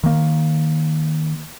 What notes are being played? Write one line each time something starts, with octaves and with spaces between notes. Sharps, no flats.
D#3 A#3